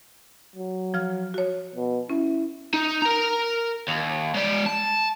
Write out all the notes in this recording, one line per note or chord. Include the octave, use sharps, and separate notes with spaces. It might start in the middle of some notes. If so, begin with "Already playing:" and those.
F#3
F3 F6
F#4 C#5
B2
C#4 E4
D#4
A#4 A#5
D#2
G#3 D5
A5